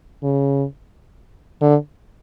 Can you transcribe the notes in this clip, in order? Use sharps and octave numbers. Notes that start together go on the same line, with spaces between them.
C#3
D3